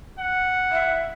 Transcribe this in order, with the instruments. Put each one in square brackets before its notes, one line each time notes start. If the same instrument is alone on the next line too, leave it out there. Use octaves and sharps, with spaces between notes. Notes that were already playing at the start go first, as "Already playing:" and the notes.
[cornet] F#5
[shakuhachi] E5